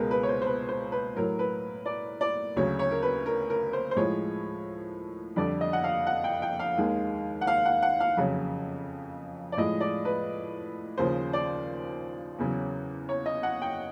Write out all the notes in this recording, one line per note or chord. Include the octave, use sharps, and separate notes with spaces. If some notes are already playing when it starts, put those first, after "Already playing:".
Already playing: C#2 B2 G#3 A#4 B4
B4
C#5
C5
C5
B4
C5
B4
A2 F#3 A#4
B4
D5
D5
D2 C#3 F#3 C#5
C#5
A#4
B4
A#4
A#4
C5
C5
A2 F3 G#3 C#5
F2 D3 G3 D5
D#5
F#5
F5
F#5
G5
G5
F5
D#2 D#3 G#3
F#5
F5
F#5
F#5
F5
F2 C#3 F#3
D5
A2 F3 G#3 D#5
D5
B4
D#2 C#3 F3 C5
D5
E2 C#3 F#3
C#5
D#5
F#5
G5